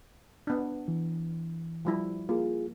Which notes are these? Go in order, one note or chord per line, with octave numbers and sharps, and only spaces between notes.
B3 D4
E3
F3 G3 E4
A#3 F4 G#4